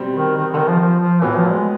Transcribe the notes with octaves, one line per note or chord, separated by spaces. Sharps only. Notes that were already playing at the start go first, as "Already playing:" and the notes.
Already playing: B2 G3 C4
D#3
D#3
D3
D#3
F3
F3
F3
A2 E3 F#3 B3
F3
G#3